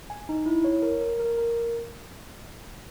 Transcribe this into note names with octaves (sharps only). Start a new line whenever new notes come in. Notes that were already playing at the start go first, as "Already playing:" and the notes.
G#5
D#4
E4
C#5
A#4
A#4
A#4
A#4